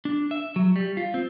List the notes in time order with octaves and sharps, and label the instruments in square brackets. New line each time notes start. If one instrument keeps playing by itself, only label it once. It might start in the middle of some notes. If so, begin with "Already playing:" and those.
[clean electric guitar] D4
E5
F#3
G3
F4
C4